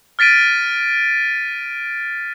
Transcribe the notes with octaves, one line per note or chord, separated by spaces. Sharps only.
F6 A6 B6 D7 D#7